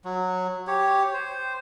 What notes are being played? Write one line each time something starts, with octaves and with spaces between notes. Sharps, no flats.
F#3
G4 C#5
C5